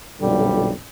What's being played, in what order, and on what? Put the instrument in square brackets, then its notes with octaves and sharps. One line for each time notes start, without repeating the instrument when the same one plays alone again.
[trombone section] B1 F2 A#2 D3 G3